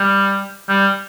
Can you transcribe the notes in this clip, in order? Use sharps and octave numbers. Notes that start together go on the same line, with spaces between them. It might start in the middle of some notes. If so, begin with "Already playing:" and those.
Already playing: G3
G3